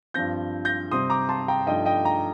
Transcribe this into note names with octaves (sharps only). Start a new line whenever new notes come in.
G2 F3 C4 G6 A#6
G6 A#6
C3 G3 C4 C6 D#6
A#5 D6
A5 C6
G5 A#5
G2 F3 A3 D#4 D#5 G5
D#5 G5
G5 A#5